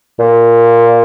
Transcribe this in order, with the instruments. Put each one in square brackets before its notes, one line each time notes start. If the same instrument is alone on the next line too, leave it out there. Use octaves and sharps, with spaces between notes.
[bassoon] A#2